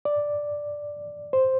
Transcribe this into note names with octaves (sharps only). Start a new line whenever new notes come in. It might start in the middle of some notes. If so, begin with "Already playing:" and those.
D5
C5